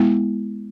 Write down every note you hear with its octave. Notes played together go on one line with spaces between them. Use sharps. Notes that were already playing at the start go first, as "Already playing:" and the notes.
Already playing: G#3 B3 E4